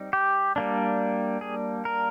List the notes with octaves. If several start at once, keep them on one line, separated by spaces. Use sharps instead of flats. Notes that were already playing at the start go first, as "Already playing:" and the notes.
Already playing: G3 C4 D#4
G4
G3 A#3 D4
G#4
A#4